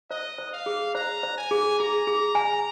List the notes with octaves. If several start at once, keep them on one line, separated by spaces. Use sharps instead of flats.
C5 D#5
C5
F5
G#4
C5 A#5
C5
G#5
G#4
G#4 A#5
G#4
G#5